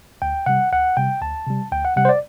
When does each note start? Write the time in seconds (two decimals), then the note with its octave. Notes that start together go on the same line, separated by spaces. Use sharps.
0.22 D2 G5
0.46 C3 G3 F#5
0.72 D2 F#5
0.97 C3 G3 G5
1.22 D2 A5
1.47 C3 G3
1.72 D2 G5
1.85 F#5
1.96 C3 G3 F#5
2.05 C5
2.09 D5